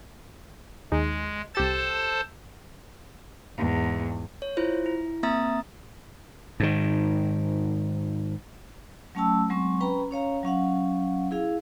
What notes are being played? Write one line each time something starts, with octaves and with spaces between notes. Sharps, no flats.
D#2 G#3 D#4 G#4
C2 G4 A4 C5 A5 A6
E2 G#2
C#5
E4 F4 C5
E4
A#3 C4 E5 A#5 D#6 A6
G#2 D#3
F#3 A3 C#4 G5 A5 E6
F#3 G#3 C4 C#6
C#4 B4 G5 A#5 B5
C#4 C#5 F5 A#5
F#3 C#4 F5 F#5
E4 G#4 F5